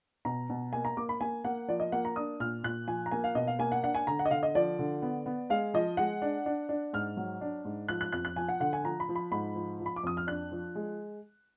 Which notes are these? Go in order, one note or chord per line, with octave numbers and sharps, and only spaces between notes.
B2 A#5
B2
A#3 G#5
A#5
A#3 D6
B5
A#3 G#5
A#3 F#5
F3 D5
D#5
A#3 F#5
A#5
D4 D#6
A#2 F6
A#2 F#6
F3 G#5
A#5
A#3 G#5
F5
B2 D#5
F5
A#3 G#5
F#5
D4 F#5
G#5
D3 A#5
F#5
D#5
D3 F5
D#5
F3 D5
D3
B3
B3
G#3 F5
F3 D#5
G#3 F#5
D4
D4
D4
G#2 F6
F#3
D4
G#2
F3 F#6
F#6
F2 F#6
F#6
F3 G#5
F#5
D3 F#5
G#5
F3 A#5
B5
F3
B5
G#2 B5
F3
F3
B5
D6
F2 D#6
F6
D4 F#6
F3
G#3